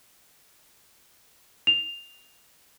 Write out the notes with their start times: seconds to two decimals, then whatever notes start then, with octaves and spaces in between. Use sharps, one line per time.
1.67 F7